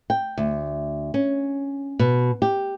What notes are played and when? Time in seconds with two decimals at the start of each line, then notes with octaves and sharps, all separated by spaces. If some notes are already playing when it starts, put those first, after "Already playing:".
0.10 G5
0.38 D2
1.14 C#4
1.99 B2
2.42 G4